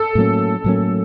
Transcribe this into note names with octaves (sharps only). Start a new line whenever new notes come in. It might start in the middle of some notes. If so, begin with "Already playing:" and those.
Already playing: A4
A2 F#3 A#3 C#4
A2 F#3 A#3 C#4